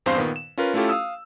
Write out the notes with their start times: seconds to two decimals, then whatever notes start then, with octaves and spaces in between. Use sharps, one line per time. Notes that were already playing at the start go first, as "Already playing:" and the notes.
0.06 E2 G2 C4 C5 F5 C6
0.18 A#2 D#3 B3
0.36 E7
0.58 C#4 F4 A#4 B4
0.74 A3 C#4 E4 F4 G4 A4
0.89 F5 D#6 E6